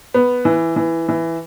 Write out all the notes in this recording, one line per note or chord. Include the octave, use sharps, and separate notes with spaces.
B3
E3
E3
E3